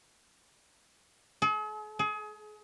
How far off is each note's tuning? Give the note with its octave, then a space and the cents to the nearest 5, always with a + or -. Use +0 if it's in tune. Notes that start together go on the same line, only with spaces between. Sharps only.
G#4 +45
G#4 +30